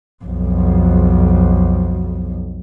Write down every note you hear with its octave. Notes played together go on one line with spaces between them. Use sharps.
B1 F2